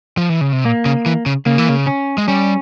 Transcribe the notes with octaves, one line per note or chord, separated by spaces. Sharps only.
F3
E3
C#3
C3
A#2 A#3
C#3
E3
C#3
C#3 A#3
E3
C#3
C#4
G#3
G3 C#4